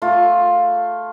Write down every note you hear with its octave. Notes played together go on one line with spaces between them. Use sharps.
A3 F4